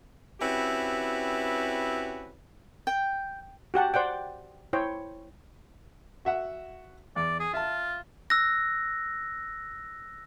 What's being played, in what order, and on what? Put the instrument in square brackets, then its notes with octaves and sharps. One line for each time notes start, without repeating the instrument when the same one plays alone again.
[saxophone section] C4 C#4 E4 F#4 G4 B4
[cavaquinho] G5
[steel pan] F#4 G4 F#5 A5
C5 D5 F#5 G5
E4 C5 C#5 G5
[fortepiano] F#4 E5 F#5
[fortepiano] E2 [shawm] D5
[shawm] G#4
[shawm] F4 [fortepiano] E5 A5
[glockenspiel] E6 F#6 A#6